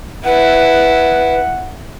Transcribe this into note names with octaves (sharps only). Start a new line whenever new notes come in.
E4 B4 F#5